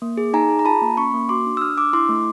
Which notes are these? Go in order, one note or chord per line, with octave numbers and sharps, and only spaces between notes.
A#3
G#4
D#4 G#5 A#5
G#4
A#5
F4 A5 B5
A#3
C#4 B5 C#6
A#3
F#4 C6 D6
D4
E6
D4 D#6 F6
D4 D6 E6
E4 C6 D6
A3